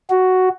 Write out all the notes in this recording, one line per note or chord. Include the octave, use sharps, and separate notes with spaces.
F#4